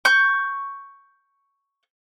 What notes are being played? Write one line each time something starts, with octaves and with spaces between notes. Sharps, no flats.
C#6 G6